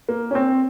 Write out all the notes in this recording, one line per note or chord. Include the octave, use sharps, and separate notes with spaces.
A#3
C#4
C4